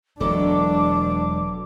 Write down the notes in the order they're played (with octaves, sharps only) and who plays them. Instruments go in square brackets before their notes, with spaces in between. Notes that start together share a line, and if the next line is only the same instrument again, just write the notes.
[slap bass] E1 [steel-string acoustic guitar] F#3 B3 A4 [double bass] D4 [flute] D6